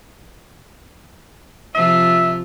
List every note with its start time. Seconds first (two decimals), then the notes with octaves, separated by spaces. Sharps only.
1.75 C3 F3 F4 E5